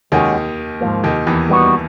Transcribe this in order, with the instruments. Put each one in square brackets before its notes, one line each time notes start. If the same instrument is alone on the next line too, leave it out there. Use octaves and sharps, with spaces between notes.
[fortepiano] D#2 D#3 [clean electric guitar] G#3 C#4 F#4
[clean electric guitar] G#2 F3 A#3
[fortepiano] D#2 D#3
E2 E3
[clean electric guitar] G3 B3 D#4 F#4